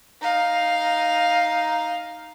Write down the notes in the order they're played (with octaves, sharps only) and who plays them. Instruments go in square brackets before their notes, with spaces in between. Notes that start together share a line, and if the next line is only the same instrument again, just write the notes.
[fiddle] D#4 F5